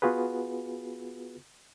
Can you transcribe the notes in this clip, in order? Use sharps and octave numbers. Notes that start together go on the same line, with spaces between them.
B3 F4 F#4 G#4 B4